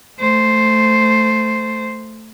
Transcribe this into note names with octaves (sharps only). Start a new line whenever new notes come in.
A3 C5